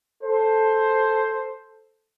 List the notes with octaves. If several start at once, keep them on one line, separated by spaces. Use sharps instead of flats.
A4 C5